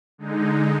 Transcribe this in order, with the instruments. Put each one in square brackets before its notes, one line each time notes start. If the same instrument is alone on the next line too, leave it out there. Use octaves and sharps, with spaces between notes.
[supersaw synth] D3 G#3 D#4